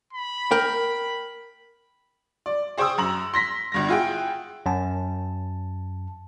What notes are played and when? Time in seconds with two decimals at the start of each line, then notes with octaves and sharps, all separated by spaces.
0.13 B5
0.51 A#4 G5
2.46 D5
2.78 G#4 C5 G5 C#6 D#6 E6
2.98 F#2 A#5 F#7
3.34 C6 A#6 B6
3.72 G1 G2 A#6
3.88 E4 F4 G#4 F#5 G5
4.66 F#2 A5